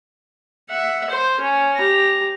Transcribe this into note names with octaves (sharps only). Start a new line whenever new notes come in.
E5 F#5
C5
C#4
G4 A#5